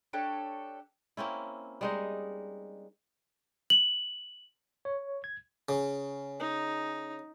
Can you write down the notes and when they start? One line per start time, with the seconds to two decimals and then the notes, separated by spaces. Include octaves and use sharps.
0.13 D4 G4 A4 C#5
1.17 A#3 C4 C#4 E4
1.81 G3 G#3 D#4
3.70 F#7
4.85 C#5
5.24 G#6
5.69 C#3
6.40 D#4